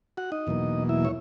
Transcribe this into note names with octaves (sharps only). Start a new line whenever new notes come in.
F#4 F#5
D#4 D#5
E2 B2 F#3 A#3
E4 E5
C#5